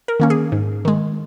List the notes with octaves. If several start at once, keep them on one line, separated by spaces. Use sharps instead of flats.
A#4
D#3 A#3 C#4
G#4
G#2
D#3 G#3